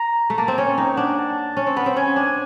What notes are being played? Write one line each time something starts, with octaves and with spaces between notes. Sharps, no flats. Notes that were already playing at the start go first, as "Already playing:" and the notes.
Already playing: A#5
A3
A#3 A5
C4
C#4 G#5
D#4 G5
D4 F#5
A5
C#4
C4
B3
C4
C#4 G#5
D4